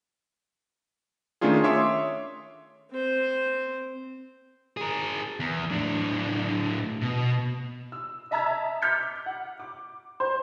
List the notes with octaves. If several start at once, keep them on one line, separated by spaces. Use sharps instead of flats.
D#3 A3 C#4 D4 F4 G#4
C#5 E5 C6 D6 D#6
C4 C5
G#4 A#4
E2
A2 D4
B2
E6
D#5 E5 A5 A#5 E6 G#6
D6 F6 G6 B6 C#7
F#5
D6
C5